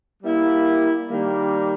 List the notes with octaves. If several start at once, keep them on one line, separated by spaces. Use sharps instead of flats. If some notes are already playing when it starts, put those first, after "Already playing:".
G3 A#3 E4
D#3 G3 A#3